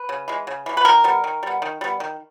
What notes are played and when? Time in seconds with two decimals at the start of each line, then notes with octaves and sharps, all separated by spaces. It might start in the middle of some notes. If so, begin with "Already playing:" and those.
Already playing: B4
0.09 C#3
0.28 E3 G#3
0.47 C#3
0.66 E3 G#3
0.77 B4
0.85 D#3 A#4
1.04 G3 B3
1.24 D#3
1.43 G3 B3
1.62 D#3
1.81 G3 B3
2.00 D#3